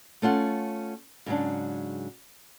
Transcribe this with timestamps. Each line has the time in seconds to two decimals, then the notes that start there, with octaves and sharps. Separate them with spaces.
0.22 A3 C#4 F4 F#5
1.26 G#2 C#3 F#3 D4